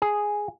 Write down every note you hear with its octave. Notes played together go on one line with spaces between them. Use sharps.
G#4